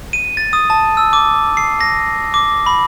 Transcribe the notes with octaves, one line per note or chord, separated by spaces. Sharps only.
D#7
A6
D#6
A5
E6
D6
C7
A#6
D6
B5